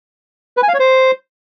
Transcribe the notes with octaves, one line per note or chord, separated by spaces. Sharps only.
B4
G#5
F5
C#5
C5